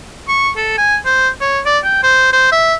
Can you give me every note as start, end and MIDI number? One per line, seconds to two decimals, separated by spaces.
0.28 0.51 85
0.56 0.73 69
0.78 0.97 80
1.05 1.29 72
1.40 1.60 73
1.66 1.79 74
1.84 2.01 79
2.03 2.30 72
2.33 2.50 72
2.52 2.75 76